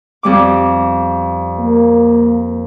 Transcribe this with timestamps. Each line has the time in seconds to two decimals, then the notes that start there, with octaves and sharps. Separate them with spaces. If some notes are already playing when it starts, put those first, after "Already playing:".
0.23 F2 G3 D6
1.59 A#3